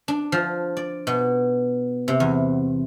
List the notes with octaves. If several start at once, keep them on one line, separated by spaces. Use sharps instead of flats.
D4
F3
D5
B2
C3
E2